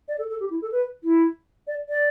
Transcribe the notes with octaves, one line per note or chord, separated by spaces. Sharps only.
D5
A4
A4
G4
E4
A4
B4
E4
D5
D5